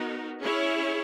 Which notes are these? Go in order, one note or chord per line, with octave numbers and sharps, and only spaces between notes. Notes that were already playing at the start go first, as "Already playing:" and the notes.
Already playing: B3 D#4 F#4 A#4
C#4 E4 G#4 C#5